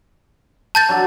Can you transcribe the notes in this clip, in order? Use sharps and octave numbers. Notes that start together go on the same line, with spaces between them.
A5 G6 A6
F#3 D4 A4